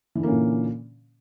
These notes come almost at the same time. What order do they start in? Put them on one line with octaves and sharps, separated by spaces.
E3 D3 A#3 C#4 A#2